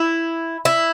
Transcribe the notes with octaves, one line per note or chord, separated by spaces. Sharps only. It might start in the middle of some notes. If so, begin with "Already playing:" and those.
Already playing: E4
E4